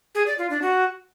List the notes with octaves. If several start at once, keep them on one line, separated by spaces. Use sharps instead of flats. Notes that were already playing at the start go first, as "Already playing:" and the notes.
G#4
D5
F4
D4
F#4